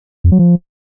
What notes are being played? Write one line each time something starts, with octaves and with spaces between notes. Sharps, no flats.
F2
F#3
F3